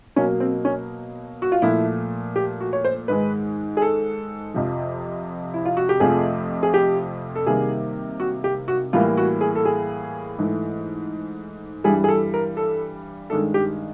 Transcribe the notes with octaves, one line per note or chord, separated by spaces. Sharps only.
B2 F#3 A#3 C#4
C4
C#4
F#4
F4
A#2 F3 A3 E4
G4
F#4
C#5
C5
G#2 D#3 G#3 B4
G#4
A4
F2 C3 F3
E4
F4
F#4
G4
F2 C3 F3 A3 G#4
G#4
G4
A4
C3 D#3 G3 A#3 G#4
F#4
G4
F#4
A2 E3 G3 A#3 F4
F#4
G#4
A4
G#4
G#2 E3 A3
G2 E3 G3 G#4
G#4
A4
A#4
A4
G2 D#3 G#3 A4
G4